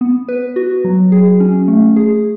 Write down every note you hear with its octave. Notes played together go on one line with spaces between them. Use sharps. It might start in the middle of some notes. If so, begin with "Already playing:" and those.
B3
B4
F#4
F#3
G#4
C#4
A3
G#4